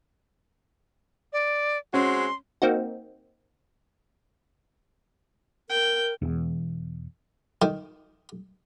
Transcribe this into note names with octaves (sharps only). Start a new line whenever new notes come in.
D5
G#3 C4 C#4 F#4 C6
A#3 C4 D#4 F#4
A#4 G5
E1 E2
D#3